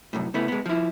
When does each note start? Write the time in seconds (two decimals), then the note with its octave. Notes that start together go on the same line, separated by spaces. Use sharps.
0.13 C2 F#2 A2
0.34 C#3 A3 B3 E4
0.48 G#3 B3
0.66 F3 E4